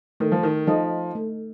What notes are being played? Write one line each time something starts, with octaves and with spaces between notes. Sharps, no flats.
D#3 A3
F3
D#3
F3 D#4 A4 D#5
A3